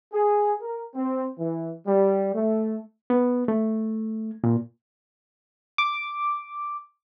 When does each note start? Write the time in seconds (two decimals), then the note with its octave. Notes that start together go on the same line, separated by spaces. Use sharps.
0.13 G#4
0.61 A#4
0.95 C4
1.38 E3
1.86 G3
2.34 A3
3.10 B3
3.48 A3
4.44 A#2
5.78 D6